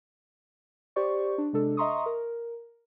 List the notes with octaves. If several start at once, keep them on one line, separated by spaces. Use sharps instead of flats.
G4 C5 D5 C#6
D4
C3 G#3 D4 A4
D#5 E5 A#5 C6 C#6 D#6
A#4